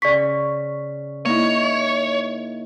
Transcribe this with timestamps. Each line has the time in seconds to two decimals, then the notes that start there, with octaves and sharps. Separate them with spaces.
0.02 C#3 D5 C#6 B6
1.25 A#3 D#4 E4 C#5